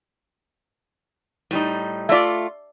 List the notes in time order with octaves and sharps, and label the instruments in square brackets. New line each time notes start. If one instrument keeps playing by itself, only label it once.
[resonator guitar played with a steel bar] A2 G3 D#4
[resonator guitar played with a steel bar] A3 F4 [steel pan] D5 E5